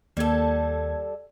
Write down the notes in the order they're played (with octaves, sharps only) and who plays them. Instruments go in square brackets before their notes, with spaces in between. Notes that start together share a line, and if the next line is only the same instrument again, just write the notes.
[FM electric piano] D#2 A#3 G#6 [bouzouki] G3 A4